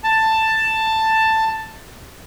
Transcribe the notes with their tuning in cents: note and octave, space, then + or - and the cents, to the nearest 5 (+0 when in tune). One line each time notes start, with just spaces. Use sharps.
A5 +10